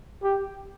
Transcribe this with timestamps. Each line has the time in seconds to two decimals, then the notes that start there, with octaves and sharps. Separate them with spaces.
0.23 G4